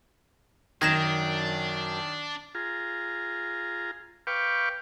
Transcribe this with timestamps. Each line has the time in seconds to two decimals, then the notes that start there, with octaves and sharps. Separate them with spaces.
0.82 F#2 D#3 F#3 D4 G5 G#6 A#6 E7
2.55 F4 G#4 A#5
4.27 B4 F5 G5 C#6 D6